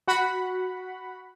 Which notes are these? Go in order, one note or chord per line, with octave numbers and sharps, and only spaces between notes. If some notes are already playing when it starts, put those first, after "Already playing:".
F#4 F#5 B5